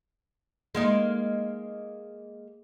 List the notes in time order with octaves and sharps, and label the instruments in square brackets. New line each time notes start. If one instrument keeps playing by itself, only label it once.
[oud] G#3 A#3 D#4